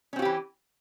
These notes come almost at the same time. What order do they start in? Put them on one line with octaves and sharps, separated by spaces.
C#4 C4 F#4 G4 E3